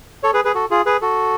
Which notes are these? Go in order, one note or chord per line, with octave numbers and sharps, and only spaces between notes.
A4 C#5
G#4 B4
G#4 B4
F#4 A4
F4 G#4
G#4 B4
F#4 A4